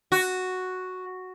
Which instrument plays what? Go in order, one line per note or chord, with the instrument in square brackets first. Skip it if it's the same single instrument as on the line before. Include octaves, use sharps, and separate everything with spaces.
[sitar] F#4